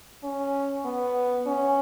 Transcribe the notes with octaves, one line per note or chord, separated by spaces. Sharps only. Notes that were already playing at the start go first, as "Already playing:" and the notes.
C#4
B3
C#4